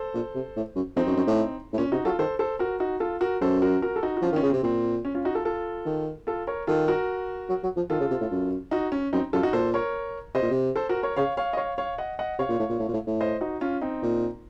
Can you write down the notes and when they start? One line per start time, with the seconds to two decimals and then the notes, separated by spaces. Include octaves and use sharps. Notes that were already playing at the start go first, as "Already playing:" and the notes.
Already playing: A4 C5
0.14 A#2
0.35 C3
0.56 A2
0.76 F#2
0.96 F2 C4 D#4
1.07 F#2
1.17 F#2
1.27 A2
1.73 A2
1.78 A#2 C#4
1.92 C3 D#4 F#4
2.05 F#3 F4 A4
2.19 D#3 A4 C5
2.39 A4 C5
2.59 F#4 A#4
2.80 D#4 F#4
3.00 F4 A4
3.21 F#4 A#4
3.41 F#2 A4 C5
3.62 F#4 A#4
3.82 F#4 A#4
3.96 A4
4.03 D#4 F#4
4.17 F#4
4.22 F3 C#4 F4
4.32 D#3 C#4 F4
4.43 C#3
4.50 C3 C4
4.63 A#2 C4
5.05 C#4
5.15 C#4 F4
5.25 D#4 F#4
5.35 F4 A4
5.45 F4 A4
5.86 D#3
6.27 F4 A4
6.47 A#4 C#5
6.67 D#3 F4 A4
6.88 F#4 A#4
7.49 F#3
7.63 F#3
7.77 F3
7.90 D#3 F4 A4
8.00 C#3
8.11 C3
8.21 A2
8.31 F#2
8.71 D#4 F#4
8.92 C#4
9.13 F#2 C4 D#4
9.33 F#2 F4 A4
9.43 D#4 F#4
9.53 A#2 A4 C5
9.74 A#4 C#5
10.35 C3 C5 D#5
10.43 A#2
10.51 C3
10.76 A4 C5
10.89 F#4 A#4
11.03 A#4 C#5
11.16 C#3 C#5 F5
11.37 C#5 F5
11.53 D#5
11.57 C#5 F5
11.78 C#5 F5
11.98 D#5 F#5
12.19 D#5 F#5
12.39 C3 C#5 F5
12.49 A#2
12.59 A2
12.70 A#2
12.79 A2
12.89 A#2
12.94 A2
13.07 A2
13.21 C5 D#5
13.41 D#4 F#4
13.61 C#4 F4
13.81 C4 D#4
14.03 A#2